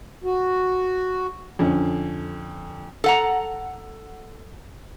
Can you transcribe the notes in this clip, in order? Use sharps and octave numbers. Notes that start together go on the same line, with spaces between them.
F#4
F2 D3 C#4
A4 F#5 A#5